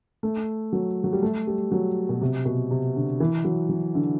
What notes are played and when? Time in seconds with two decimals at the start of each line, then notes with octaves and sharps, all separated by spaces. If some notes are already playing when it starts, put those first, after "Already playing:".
0.23 A3
0.73 F#3
1.04 F#3
1.13 G3
1.22 A3
1.47 G3
1.72 F#3
2.09 B2
2.22 C3
2.45 B2
2.71 C3
2.96 D3
3.20 E3
3.45 F#3
3.69 F#3
3.95 D3